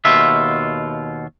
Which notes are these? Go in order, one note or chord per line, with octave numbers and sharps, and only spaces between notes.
D#2 B2 F4 E5